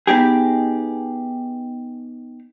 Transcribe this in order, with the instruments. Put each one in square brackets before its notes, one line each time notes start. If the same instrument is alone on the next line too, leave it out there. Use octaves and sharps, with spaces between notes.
[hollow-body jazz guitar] B3 D#4 G4 G#4